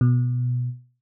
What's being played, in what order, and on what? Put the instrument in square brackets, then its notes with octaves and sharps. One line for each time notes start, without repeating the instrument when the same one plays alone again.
[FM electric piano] B2